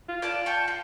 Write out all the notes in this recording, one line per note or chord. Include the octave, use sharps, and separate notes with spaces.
F4
D5 A5 F#6
G5 A5 C#6
F4